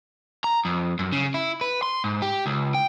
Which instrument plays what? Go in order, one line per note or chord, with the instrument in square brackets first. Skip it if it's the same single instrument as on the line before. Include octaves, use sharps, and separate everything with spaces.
[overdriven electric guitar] A#5
F2
F#2
C#3
E4
B4
C6
G#2
G4
C#2
G5